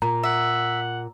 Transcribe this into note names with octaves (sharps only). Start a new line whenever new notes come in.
A#2 A#5
E5 F#5